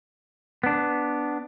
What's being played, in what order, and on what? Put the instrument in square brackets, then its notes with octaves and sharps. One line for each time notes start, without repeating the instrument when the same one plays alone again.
[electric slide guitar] B3 D4